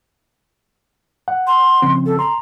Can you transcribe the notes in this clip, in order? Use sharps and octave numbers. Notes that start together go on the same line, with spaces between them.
F#5
C6
C#3 F3 C4
A4
A#5 C6